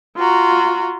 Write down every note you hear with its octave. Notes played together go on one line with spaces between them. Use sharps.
F4 F#4 A#5